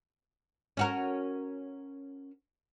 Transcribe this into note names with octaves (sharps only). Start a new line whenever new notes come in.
C#4 F#4 A#4